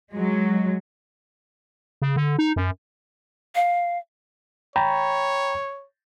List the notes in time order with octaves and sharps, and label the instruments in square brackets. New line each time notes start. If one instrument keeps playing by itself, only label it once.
[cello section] F#3 G#3
[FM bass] C#3
D3
D#4
F#2
[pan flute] F5
[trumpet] C#5 [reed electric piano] G5 A#5 B5